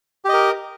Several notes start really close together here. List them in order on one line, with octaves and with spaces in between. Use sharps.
G4 D#5 A#4